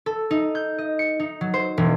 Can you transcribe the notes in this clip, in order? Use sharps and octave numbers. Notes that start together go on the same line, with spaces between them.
A4
D#4
G6
D#5
C#7
D#4
F#3
C5
E1